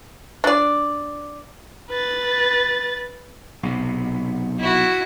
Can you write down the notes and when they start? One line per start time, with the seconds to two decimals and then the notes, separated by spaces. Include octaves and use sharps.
0.44 D4 D5
1.90 B4 A6
3.63 B1 C3
4.59 E4 F#4